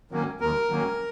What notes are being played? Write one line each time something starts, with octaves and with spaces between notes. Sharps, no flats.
D#3 F#3 A#3 C#4
D#2 A#4
D#3 F#3 A#3 C#4